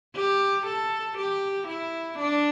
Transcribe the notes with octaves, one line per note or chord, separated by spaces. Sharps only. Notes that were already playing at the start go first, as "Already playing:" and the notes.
G4
A4
G4
E4
D4